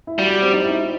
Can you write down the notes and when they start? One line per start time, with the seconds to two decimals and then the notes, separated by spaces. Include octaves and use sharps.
0.07 E4
0.19 G3 F#4
0.30 F#4
0.42 C4
0.53 D#4
0.64 E4